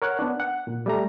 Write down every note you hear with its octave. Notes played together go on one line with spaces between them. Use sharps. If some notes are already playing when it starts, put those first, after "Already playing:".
A#4 C#5 F#5 F#6
B3 D4
F#5
A#2
G3 A3 A#5